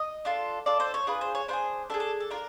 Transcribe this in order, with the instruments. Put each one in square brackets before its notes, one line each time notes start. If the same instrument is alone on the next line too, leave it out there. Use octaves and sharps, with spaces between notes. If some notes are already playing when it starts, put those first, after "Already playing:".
Already playing: [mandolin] D#5
D4 F4 A4
D4 F4 A4 D5
C5
C#5
D4 F4 G#4 B4
C5
C#5
D4 F4 C5
G#4
D4 F4 G#4 A4
A4
A4
D4 F4 A#4